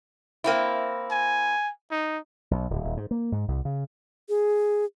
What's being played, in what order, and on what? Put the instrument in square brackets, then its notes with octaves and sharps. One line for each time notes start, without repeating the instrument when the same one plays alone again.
[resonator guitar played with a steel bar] A#3 C4 E4
[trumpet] G#5
D#4
[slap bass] B1
D1
D#1
G#2
A#3
G#2
C2
C#3
[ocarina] G#4